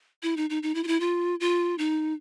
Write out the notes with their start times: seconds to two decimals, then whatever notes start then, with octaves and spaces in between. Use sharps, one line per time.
0.23 E4
0.37 D#4
0.50 D#4
0.63 D#4
0.75 E4
0.84 F4
0.87 E4
1.00 F4
1.40 F4
1.78 D#4